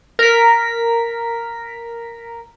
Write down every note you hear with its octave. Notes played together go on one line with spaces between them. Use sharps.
A#4 B6